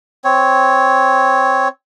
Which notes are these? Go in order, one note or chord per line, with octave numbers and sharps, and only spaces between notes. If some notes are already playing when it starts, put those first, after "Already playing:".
C4 C#5